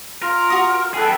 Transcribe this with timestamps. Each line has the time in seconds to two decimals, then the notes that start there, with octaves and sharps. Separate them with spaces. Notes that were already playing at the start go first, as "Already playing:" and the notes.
0.22 F4 A#4
0.50 F#4 D#6
0.94 G#4 A4 B4 G5